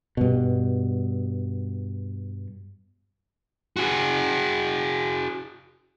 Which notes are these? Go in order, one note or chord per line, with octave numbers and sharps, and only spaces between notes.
G2 B2
F#4 G#4